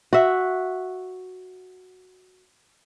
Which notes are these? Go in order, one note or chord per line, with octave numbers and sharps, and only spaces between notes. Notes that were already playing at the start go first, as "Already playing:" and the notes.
F#4 E5